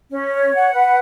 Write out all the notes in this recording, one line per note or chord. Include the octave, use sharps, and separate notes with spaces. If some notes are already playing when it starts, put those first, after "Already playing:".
C#4
C#5
F#5
B4